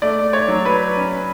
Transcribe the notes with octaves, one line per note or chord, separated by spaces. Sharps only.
A3 D5
C#5
F#3
B4
C#4